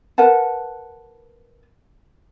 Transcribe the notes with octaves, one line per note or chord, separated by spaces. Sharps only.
A#4 B4 F#5 A5